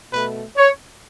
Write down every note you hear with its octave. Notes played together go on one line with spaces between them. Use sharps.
B2 A3 B4
C#5